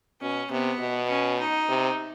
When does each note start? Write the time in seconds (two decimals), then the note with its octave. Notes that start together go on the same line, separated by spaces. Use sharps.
0.21 B2 C#4
0.51 C3 B3
0.80 B2
1.10 C#4
1.39 D#4
1.69 C3